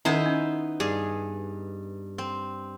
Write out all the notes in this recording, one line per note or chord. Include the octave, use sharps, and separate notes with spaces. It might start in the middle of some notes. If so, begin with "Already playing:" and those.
D#3 B3 C#4 D#4 E4 A4 C5 E5
C#4
G2 G#4
C4